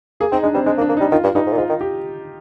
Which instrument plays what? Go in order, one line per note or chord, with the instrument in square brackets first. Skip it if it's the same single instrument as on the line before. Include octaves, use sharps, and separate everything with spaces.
[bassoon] A#3 [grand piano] G#4
[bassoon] C4 [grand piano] D#4
[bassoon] G#3 [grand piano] D4
[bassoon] G3 [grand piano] C4
[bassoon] G#3 [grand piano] D4
[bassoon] A#3
[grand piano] D4
[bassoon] A#3
[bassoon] G3 [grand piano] D#4
[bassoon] D#3 [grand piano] F4
[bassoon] G2
[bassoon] G2 [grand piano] D#4
[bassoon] G#2
A#2
[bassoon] G#2 [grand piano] F4
[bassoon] D#3
[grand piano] G4